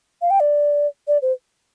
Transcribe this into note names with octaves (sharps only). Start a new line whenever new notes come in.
F5
G5
D5
D5
C5